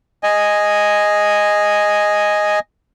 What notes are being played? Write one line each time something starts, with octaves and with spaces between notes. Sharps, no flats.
D#5 G#5